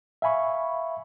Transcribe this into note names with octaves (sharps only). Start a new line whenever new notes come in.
E5 F5 G#5 B5 C#6